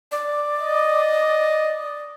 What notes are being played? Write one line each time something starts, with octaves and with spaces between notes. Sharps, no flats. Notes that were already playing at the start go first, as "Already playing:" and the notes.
D5
D#5